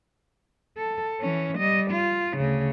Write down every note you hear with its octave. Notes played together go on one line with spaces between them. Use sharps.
A4
E3 C#4
G3 D#5
F4
D2 C#3